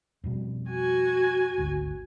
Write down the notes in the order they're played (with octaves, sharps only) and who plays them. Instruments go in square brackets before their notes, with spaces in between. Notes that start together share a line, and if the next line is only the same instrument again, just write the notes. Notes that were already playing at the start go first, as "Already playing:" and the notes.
[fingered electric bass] F2 B2 G3
[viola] F#4 G#5
[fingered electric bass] G#1 D2